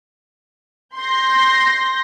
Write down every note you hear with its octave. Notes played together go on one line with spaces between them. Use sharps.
C6 G6 A#6 C7